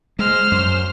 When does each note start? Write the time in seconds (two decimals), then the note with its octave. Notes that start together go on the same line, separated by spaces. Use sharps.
0.19 G#3 C5 F6
0.52 F#2